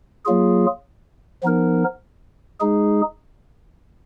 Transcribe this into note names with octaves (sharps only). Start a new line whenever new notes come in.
F#3 A#3 F4 G#4
F3 B3 D#4 A#4
G#3 D#4 G#4